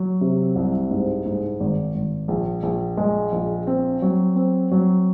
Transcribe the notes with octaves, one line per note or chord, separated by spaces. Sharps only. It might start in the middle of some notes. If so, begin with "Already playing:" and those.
Already playing: F#3
C3
C2
G#2
G#2
G#1
G#1
A#1
A#1
G#3
A#1
C4
F#3
C4
F#3